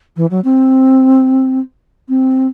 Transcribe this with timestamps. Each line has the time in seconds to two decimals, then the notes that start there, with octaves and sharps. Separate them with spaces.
0.17 E3
0.31 F#3
0.44 C4
2.09 C4